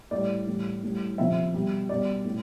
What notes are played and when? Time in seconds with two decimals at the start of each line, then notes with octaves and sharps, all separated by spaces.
0.11 A2 G3 D5
0.47 A2 E3 G3
0.83 A2 G3
1.18 C3 F3 E5
1.54 B2 G3
1.89 B2 G3 D5
2.25 A2